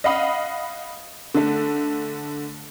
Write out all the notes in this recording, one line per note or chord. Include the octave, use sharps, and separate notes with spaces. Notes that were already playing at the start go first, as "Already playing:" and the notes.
D#5 F5 F#5 B5 D#6
D3 A3